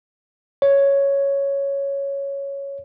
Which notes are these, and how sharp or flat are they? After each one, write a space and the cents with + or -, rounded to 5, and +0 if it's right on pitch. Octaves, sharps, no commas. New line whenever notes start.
C#5 +0